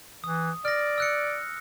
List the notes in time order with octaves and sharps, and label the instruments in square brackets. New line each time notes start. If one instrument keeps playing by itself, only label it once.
[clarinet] E3 [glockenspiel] D#6
[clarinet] D5 [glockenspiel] F6 A#6
[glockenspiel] E6 F#6 C#7